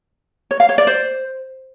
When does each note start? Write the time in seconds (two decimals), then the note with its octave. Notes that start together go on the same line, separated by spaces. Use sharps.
0.51 C#5
0.60 F5
0.69 C#5
0.78 D5
0.87 C5